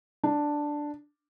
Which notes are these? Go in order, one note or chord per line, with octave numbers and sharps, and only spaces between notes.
D4